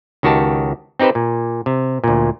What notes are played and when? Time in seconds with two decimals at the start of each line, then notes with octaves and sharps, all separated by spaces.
0.23 C#2 D#3 F#4 G4 A5
0.99 C4 D#4 G4 B4 C5
1.15 A#2
1.66 C3
2.04 D2 A#2